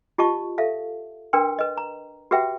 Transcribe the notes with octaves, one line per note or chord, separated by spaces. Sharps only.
F4 G4 D#5 A5 C#6
A4 E5 F5
D4 A#4 B4 G5 C6
B4 D#5
A#5
F#4 G4 B4 E5 F#5 G5